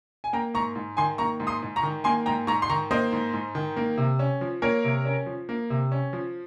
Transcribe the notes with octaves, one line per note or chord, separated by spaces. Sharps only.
G#5
A#3 G5 A#5
G#2 A#5 C#6
G#2
D#3 G#5 C6
A#3 A#5 C#6
G#2
C6 D#6
G#2
A#5 C#6
D#3
A#3 G#5 C6
G#2 G5 A#5
G#2 A#5 C#6
C6
D#3 A#5 C#6
A#3 C5 D#5
G#2
G#2
D#3
A#3
C3
C#4
F3
A#3 A#4 C#5
C3
C#4
F3
A#3
C3
C#4
F3